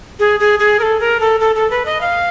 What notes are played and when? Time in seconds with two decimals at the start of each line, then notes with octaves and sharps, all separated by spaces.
0.19 G#4
0.40 G#4
0.59 G#4
0.79 A#4
0.83 A4
1.00 A#4
1.20 A4
1.40 A4
1.56 A4
1.70 B4
1.86 D#5
2.01 F5